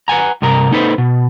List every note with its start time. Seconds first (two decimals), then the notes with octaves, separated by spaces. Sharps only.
0.08 B4 F#5 G#5 A#5
0.42 G2 C3 A#4 A#5
0.71 A#3 D#4 A4 B4 C5
0.98 B2